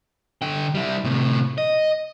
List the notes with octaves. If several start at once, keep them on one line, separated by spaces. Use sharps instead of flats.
D3 G5
G3 E4
A2 C3
D#5